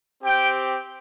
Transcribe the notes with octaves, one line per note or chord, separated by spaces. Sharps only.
C4 G4 G5